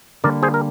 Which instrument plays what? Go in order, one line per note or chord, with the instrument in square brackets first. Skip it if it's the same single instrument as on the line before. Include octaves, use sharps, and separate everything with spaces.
[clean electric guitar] D3 G3 A#3 [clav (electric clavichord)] A#4 D5
[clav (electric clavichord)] G#4 C5
A#4